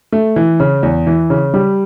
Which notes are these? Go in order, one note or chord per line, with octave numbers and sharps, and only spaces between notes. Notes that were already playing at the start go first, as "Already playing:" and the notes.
A3
E3
C#3
E2
E3
C#3
G3